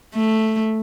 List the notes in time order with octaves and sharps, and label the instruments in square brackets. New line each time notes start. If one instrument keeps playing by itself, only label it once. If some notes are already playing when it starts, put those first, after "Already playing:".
[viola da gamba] A3